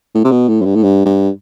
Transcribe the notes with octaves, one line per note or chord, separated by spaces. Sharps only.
A2
C3
B2
A2
F#2
G2
A2
G2
G2